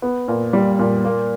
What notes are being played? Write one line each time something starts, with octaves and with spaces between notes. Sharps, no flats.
B3
A#2
G3
A#2
A#3